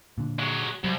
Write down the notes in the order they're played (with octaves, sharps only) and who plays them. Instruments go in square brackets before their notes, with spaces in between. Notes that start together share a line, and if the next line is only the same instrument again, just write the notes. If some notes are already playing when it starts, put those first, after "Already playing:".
[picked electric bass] A#2 D3
[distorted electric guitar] F#3 G#3
[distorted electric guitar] C2 [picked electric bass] F#3